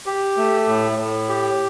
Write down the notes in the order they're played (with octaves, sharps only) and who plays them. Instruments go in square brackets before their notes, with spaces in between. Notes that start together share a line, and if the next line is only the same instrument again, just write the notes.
[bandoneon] G4
A3
A2
A2
G4